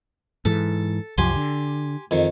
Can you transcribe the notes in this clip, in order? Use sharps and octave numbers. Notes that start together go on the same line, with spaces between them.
G#2 E3 A4
C2 F#2 F3 G4 G#5 C6
D3
F2 D#3